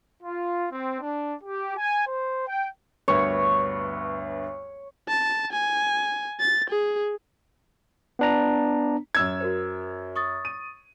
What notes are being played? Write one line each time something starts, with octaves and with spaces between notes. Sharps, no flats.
F4
C4
D4
G4
G#5
C5
G5
D2 G2 B3 C#5
A5
G#5
A6
G#4
B3 D4 A#5
F#2 E6 G#6
F#4 A#4 C5
C#6 D#6 A6
D#7